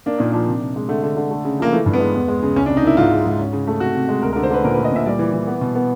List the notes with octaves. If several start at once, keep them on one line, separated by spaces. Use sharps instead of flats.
A#3 D4
A#2 D#4
F3 D4
C3
C3
G#3
D3 A3
D3
D3
A3
C#3
F3 A#3
E3 A3
G2
B3
G#3
E2
G#3
C#3
C#2 C#4
D4
C3
D#4
A#3 E4
G#2 F4
G#3
G#2
C#4
C#3
A3
C3 F#4
C3
G#3
D2 A#4
A#4
D3
C5
D3 B4
A#2 A#4
B4
A3
D#5
A#2 E5
G3 D5
E3
E3
B3
B2
B3